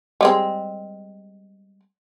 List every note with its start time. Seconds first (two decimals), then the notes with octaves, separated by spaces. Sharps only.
0.21 G3 G#3 C4